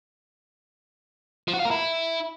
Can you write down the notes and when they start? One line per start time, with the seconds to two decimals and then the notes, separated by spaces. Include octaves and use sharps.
1.48 F3
1.54 F#4
1.59 F4
1.65 A#4
1.71 E4